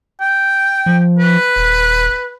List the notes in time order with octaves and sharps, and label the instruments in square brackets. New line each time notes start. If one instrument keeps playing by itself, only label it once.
[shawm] G5
[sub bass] F3
[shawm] B4
[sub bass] D#1